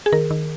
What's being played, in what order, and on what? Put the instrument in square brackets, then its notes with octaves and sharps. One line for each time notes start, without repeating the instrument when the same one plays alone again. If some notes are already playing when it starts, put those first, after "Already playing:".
[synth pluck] G#4
D#3 A#4
D#3